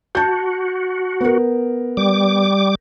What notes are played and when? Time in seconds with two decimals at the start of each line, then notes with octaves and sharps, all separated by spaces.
0.15 F#4 A5 G6
1.21 B3 A#4
1.97 G3 D6